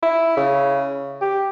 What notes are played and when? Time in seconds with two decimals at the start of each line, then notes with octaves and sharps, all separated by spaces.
0.02 E4
0.37 C#3
1.21 G4